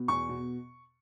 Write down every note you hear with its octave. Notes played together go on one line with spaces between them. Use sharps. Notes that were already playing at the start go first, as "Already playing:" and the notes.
Already playing: B2
E2 C#6
B2